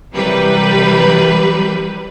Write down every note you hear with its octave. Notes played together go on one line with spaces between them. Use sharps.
C3 E3 F#3 G3 A#4 B4